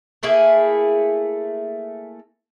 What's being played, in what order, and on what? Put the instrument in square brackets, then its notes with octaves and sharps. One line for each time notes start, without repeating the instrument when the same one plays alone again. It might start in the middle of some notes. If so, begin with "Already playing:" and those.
[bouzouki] A3 A#3 E4 G#4